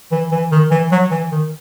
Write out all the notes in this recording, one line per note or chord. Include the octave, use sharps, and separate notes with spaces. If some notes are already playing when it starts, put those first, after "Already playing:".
E3
E3
D#3
E3
F#3
E3
D#3